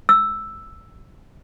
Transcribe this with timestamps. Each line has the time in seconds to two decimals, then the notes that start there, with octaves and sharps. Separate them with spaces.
0.09 E6